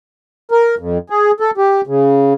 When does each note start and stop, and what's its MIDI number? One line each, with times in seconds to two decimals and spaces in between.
0.51 0.75 70
0.79 0.98 41
1.10 1.31 68
1.40 1.51 69
1.58 1.81 67
1.87 2.33 49